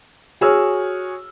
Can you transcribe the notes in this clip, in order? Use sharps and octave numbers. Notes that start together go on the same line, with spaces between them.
F#4 G#4 C#5 E6 F6